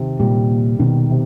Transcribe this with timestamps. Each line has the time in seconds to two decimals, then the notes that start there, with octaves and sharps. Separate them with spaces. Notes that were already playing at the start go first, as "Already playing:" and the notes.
Already playing: C3 D#3
0.19 A#2 G3
0.49 A#3
0.79 B2 D#3
1.09 C3